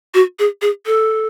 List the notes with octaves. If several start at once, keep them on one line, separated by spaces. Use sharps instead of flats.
F#4
G#4
G#4
A4